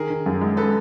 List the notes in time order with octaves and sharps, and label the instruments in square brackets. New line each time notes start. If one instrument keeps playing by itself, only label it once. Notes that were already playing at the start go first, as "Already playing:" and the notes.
Already playing: [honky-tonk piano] D#3 [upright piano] G#4 A#4
[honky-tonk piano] D#3
F#2
G#3
[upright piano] A4 B4